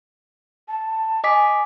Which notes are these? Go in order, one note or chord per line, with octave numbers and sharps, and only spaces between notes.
A5
D#5 G#5 D6 B6